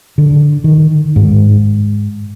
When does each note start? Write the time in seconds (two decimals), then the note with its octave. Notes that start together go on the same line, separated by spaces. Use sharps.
0.18 D3
0.64 D#3
1.16 G#2